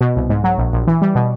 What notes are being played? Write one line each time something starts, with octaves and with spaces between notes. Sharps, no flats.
B2
C2
G#2
F#3
A#1
A#1
E3
G3
B2